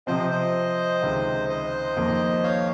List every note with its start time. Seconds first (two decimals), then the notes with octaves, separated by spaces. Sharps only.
0.07 C3 F3 C4 C5 D#5
0.31 C5 D#5
1.02 C#2 C3 D#3
1.49 C5 D#5
1.97 F2 D#3 A#3
2.43 C#5 F5